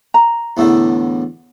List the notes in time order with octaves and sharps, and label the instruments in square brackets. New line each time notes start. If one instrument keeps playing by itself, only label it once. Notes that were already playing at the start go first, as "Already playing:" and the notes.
[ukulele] A#5
[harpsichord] E2 A2 D3